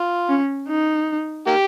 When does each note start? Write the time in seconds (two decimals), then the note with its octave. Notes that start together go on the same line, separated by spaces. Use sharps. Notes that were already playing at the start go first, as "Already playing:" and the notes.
Already playing: F4
0.29 C#4
0.68 D#4
1.47 A#3 G4